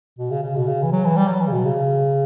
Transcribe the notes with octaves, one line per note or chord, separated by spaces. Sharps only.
B2
C#3
C#3
B2
C#3
E3
F#3
E3
G3
F#3
E3
C#3
B2
C#3